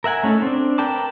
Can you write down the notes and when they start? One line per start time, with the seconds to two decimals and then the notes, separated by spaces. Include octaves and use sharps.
0.04 A#4 E5 F#5 G#5
0.23 A3 C#4 D#4 A4
0.42 C4 D4
0.78 A#4 B4 G5 A5 D6